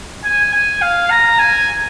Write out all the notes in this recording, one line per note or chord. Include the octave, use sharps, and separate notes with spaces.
G#5
G#5
F5
A#5
G#5